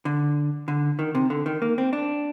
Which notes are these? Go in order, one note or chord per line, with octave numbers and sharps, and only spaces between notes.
D3
D3
D#3
C3
D3
D#3
A#3
C4
D4